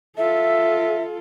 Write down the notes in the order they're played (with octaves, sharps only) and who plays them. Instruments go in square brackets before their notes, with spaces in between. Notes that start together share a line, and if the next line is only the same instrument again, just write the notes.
[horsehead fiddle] F4 A4 [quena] E5